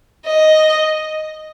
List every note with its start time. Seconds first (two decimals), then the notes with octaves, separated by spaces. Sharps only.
0.25 D#5